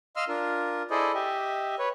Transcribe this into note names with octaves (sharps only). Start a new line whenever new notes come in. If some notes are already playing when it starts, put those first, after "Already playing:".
D#5 F5 C6 E6 F6
D4 F4 A#4
E4 G#4 A4 C5 D5 D#5
G4 D#5 E5
B4 C#5